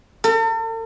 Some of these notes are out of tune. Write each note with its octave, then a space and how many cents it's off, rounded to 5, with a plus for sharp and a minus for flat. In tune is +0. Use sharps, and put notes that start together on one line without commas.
A4 +45